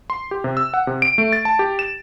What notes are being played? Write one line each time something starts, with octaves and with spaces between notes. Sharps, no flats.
C6
G4
C3
E6
F#5
C3
D7
A3
A6
A5
G4
E7